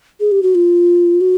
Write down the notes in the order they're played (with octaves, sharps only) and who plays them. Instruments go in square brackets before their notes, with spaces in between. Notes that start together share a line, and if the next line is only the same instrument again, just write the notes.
[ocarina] G#4
G4
F#4
F4
F#4